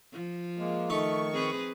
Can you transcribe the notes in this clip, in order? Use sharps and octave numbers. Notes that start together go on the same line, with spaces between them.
F3
G#3 A#3
D#3 A3 D#4 C#6
C4 G#4 B4